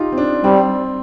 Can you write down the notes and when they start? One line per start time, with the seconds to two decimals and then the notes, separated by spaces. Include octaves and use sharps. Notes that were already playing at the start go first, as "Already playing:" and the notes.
Already playing: D#4 F4 G4
0.12 C4
0.18 D4
0.44 G3 C4